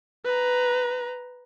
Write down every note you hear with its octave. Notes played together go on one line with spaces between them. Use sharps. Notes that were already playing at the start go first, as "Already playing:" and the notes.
B4 A#5